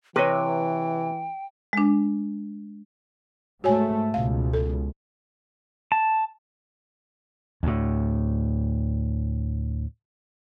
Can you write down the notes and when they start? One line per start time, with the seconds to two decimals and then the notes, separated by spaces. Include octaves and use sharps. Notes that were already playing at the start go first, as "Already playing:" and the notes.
0.16 C3 E3 B4 C#5 D#5 G5
1.73 G#3 D4
3.64 G#2 A3 F#4 C#5 G#5
4.14 C#2 B2 F5
4.53 A4
5.92 A5
7.63 D2 A2